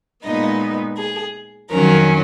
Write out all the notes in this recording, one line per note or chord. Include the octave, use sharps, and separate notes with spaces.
A#2 G#3 B3 D#4 D#5
G#4
F2 D#3 F#3 C#4 A#4